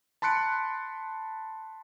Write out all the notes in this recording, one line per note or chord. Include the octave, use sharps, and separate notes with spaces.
A5 B5 C6 F#6 C#7 D7